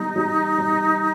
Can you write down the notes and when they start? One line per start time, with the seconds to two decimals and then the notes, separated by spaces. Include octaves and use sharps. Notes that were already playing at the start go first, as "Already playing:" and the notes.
Already playing: G3 B3 D#4
0.16 G3
0.58 G3